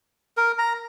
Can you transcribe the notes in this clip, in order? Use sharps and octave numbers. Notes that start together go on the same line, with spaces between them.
A#4
A#5